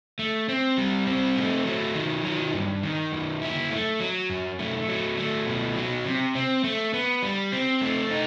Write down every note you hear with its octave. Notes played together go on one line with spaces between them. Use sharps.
A3
C4
G3
C4
A3
F#3
D#3
F#3
G2
D#3
F#2
E4
A3
F#3
F#2
A3
F#3
A3
B2
F#3
C3
C4
A3
B3
G3
C4
A3
D#4